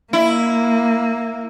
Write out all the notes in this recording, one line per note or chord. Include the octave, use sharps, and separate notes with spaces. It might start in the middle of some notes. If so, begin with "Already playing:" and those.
A#3 E4